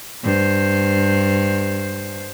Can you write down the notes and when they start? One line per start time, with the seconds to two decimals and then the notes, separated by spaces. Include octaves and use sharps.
0.24 G2 C5